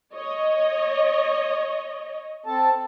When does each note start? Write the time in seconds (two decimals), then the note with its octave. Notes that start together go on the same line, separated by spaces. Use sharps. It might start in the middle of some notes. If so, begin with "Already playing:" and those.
0.14 C#5 D#5
2.46 C4 A4 A5